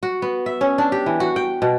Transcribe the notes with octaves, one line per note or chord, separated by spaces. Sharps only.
F#4
B3
E5
C#4
D4
G4
E3
F#4
G5
B2